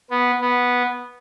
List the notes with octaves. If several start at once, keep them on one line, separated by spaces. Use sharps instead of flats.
B3
B3